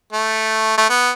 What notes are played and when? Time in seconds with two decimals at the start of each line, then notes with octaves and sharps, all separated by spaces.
0.13 A3
0.78 A3
0.90 B3